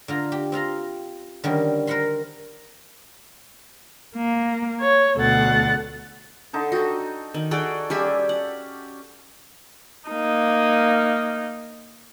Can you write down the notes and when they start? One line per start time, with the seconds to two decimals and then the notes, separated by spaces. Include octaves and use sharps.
0.08 D3 F4 A#5
0.32 G4
0.52 C4 F4 A#5 C6
1.44 D3 D#3 G3 C#4
1.87 A#4 C5 F#5 B5 C6
4.15 A#3
4.80 C#5
5.16 D2 B2 A4 F#5 A6
6.53 D3 D#4 A5
6.72 F#4 A4 D#5 G5
7.34 D#3
7.51 F#4 G#4 A4 D5 G5
7.90 G3 C#4 G4 G#4 D5 E5
8.29 F#5
10.09 A#3 D#4